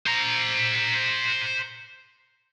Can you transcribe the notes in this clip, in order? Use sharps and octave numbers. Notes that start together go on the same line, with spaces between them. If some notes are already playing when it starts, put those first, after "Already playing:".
C5 A#5